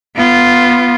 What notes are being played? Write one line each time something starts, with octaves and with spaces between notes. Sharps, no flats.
B3 F4